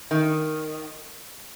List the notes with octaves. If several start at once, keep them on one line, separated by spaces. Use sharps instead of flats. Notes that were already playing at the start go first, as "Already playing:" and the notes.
D#3